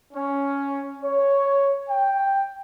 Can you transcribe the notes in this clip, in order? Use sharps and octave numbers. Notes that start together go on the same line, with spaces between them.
C#4
C#5
G5